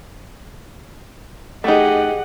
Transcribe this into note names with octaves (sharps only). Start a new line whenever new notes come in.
A3 D#4 G4 G#4 D#5 F#5